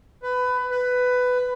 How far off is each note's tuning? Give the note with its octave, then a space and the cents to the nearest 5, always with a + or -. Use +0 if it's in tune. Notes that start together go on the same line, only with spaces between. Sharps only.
B4 +20
B4 +15